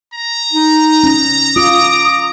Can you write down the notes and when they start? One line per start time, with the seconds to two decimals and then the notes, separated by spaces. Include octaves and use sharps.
0.14 A#5
0.53 D#4
1.04 C#4
1.56 F4 D6 D#6